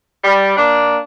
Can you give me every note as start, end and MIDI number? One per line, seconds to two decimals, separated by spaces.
0.23 0.53 55
0.57 0.97 58
0.57 0.97 62